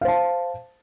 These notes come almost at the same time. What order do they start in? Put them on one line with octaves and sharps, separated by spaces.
F5 C5 A5